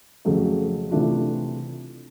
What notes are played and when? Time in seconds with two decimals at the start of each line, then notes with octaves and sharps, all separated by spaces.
0.25 F2 C#3 F#3 A3
0.91 C3 E3 A3 D4 F4